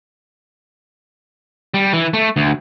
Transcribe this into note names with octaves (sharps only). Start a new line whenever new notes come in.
G3
E3
A3
D2